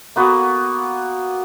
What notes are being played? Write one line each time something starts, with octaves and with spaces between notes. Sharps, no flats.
A#3 B3 F#4